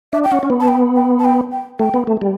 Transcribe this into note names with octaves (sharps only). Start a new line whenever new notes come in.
D4 E5
G5
C#4 F#5
C#4
B3
A5
G5
G5
A5
G5
G5
A3 G5
B3
A3
G3